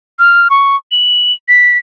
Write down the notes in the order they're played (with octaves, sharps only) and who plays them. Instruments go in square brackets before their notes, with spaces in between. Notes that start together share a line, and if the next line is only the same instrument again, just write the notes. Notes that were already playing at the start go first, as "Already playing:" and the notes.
[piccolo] F6
C#6
F#7
B6